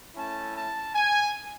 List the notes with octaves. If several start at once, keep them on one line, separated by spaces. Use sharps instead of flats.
A3 C#4 E4 A5
A5
G#5